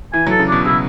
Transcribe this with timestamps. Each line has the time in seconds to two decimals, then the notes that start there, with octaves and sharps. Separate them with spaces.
0.13 E3 G#5
0.27 F#3 A4
0.39 C#3
0.48 B2 D4
0.65 C#3 E4